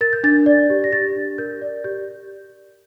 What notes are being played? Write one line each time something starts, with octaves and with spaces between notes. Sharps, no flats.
A#4 A6
G6
D4 A6
D5
G4
A#6
G4 A6
D4
A#4 G6
D5
G4 G6